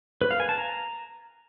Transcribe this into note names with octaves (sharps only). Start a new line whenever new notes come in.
B4
F5
G#5
A5
A#5